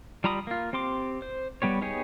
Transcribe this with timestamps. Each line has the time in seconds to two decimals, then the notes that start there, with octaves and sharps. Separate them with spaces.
0.24 G3 F4 A#5 B5 D#6
0.47 A#3 F4
0.73 C4 G4 C6 D6
1.22 C5
1.62 G3 B3 G4 C#5
1.81 B3 D#4 G4 G#4 C#5